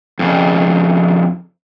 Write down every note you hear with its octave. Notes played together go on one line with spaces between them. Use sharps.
F2 C#3